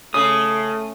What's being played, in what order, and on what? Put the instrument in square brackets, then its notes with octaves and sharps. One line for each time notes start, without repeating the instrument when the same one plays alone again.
[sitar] C#3 [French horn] A3 [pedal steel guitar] D#6